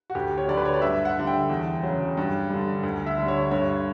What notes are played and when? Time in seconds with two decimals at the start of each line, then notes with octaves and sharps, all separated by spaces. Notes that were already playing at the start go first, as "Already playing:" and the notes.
0.10 F#4
0.15 D2 G4
0.38 C#5
0.48 D3 F#3 D5
0.57 B4
0.65 C#5
0.74 D5
0.82 G2 E5
1.05 F#5
1.17 D3 G3
1.27 G5
1.50 E2
1.83 C#3 F#3
2.17 G2
2.50 D3 G3
2.83 D2
3.06 E5
3.18 D3 G3
3.28 C#5
3.51 G2 C#5